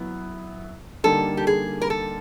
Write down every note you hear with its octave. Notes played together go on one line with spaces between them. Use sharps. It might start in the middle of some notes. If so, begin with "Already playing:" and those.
Already playing: F#3 B3 E4
D3 G3 A#3 D#4 A4
G4
G#4
A#4
A4